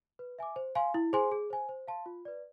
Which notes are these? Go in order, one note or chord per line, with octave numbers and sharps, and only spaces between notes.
B4
E5 G#5 D6
C5
F5 G#5 C6
E4
G#4 C5 G#5 C6
G#4
C5 G#5
C5
F5 A5 C6
F4
B4 D5